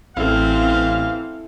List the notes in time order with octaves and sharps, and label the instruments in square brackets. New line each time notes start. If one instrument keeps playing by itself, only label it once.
[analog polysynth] A1 [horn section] E3 F5 [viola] C4 [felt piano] E4 A4